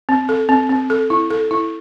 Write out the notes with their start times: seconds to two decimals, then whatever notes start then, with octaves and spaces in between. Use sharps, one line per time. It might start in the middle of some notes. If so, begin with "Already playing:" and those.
0.09 C4
0.29 A4
0.49 C4
0.70 C4
0.90 A4
1.10 E4
1.30 A4
1.51 E4